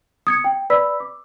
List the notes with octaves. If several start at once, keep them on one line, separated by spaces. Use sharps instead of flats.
D#6 G#6 C#7
G5
B4 D5 B5 E6 B6
D6